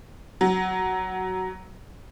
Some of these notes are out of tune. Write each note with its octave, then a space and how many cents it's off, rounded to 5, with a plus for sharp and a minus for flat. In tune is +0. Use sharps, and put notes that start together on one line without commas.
F#3 +10